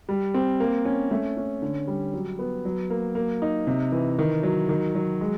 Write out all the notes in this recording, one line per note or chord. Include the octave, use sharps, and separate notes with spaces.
G3
C4
A#3
C#4
A3
C#4
D3
G3
F#3
B3
F#3
A#3
A#3
D#4
C3
E3
D#3
F#3
D#3
F#3
G#3